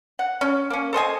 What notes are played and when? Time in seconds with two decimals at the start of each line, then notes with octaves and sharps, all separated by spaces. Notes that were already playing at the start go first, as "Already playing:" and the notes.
0.19 F#5
0.41 C#4
0.70 A#3 C#4
0.93 A4 C5 D#5 G#5